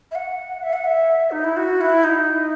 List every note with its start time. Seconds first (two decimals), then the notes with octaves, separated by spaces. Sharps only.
0.11 E5
0.15 F#5
0.63 E5
0.73 F#5
0.84 E5
1.31 D#4
1.44 E4
1.57 F#4
1.81 E4
2.04 D#4